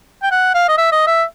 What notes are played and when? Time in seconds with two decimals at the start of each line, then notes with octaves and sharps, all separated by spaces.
0.23 G5
0.32 F#5
0.55 F5
0.68 D#5
0.78 E5
0.92 D#5
1.07 E5